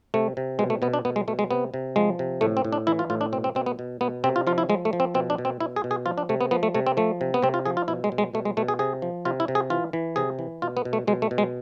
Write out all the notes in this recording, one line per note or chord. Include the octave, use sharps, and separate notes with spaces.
C3 A3
C3
B2 G#3
A3
B2 B3
D4
B2 B3
G#3
B2 A3
G#3
C3 B3
C3
F3 G#3
C3
A2 A3
C4
A2
D4
E3 E4
F4
A2 F4
D4
B2 C4
C4
B2 C4
B3
B2
B2 B3
C3 C4
F4
F3 F4
E4
F3 G#3
A3
F3
C4
B2 C4
D4
B2
C4
B2 E4
G#4
B2
G#4
F3 F4
D4
C3 A3
B3
F3 B3
A3
C3 A3
C4
F3 A3
C3
B3
C3 C4
F4
F3 G#4
F4
B2 E4
G#3
B2
G#3
B2 A3
G#3
B2 A3
G#4
C3 G#4
F3
C3 F4
E4
C3
G#4
E3 F4
E3
C3 G#4
E3
B2 F4
B3
B2
A3
B2 G#3
A3
B2
G#3